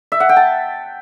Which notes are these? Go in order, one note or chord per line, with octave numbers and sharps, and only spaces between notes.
E5
F#5
G5
A5